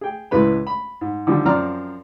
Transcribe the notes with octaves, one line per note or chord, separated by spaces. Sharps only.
G#4 G5
C#2 A2 G#3 B4 B5
B5
G#2
D3 D#3 F3 G3
F#2 F3 C4 D5 A#5 F6